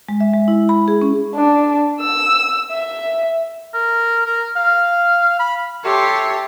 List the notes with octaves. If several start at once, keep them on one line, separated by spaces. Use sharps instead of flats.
G#3
E5
G#3
E4
B5
G#4
C#4
D4
E6
E5
A#4
A#4
F5
B5
G4 A4 C#5 E5 C6